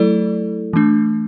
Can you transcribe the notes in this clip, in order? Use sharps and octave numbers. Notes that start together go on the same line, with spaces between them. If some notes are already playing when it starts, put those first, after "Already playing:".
Already playing: F#3 A3 E4 A4 D5
E3 A3 D4